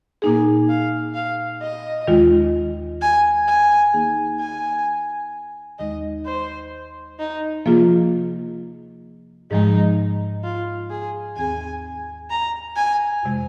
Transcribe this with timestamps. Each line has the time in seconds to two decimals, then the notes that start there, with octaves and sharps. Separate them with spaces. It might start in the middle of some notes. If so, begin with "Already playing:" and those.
0.22 A#2 A#3 D#4 G#4 G#5
0.69 F5
1.15 F5
1.62 D#5
2.08 D#2 D#3 G#3 F4
3.01 G#5
3.48 G#5
3.94 D#3 A#3 D#4 G#4
4.40 G#5
5.79 D#2 D#3 G#3 D#4 D#5
6.26 C5
7.19 D#4
7.66 C3 F3 A#3 F4 G#4
9.51 G#2 F3 G#3 D#4
10.43 F4
10.90 G#4
11.37 D#2 D#3 C4 G#4 G#5
12.30 A#5
12.76 G#5
13.23 F2 C3 G#3